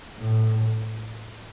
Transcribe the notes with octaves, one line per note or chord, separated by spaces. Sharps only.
A2